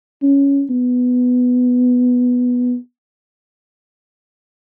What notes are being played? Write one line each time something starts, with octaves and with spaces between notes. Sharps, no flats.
C#4
B3